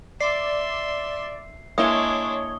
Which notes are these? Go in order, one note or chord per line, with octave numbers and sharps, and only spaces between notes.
D5 E5 C6 C7
G#3 A#3 D4 E4 C#5 D#6 G7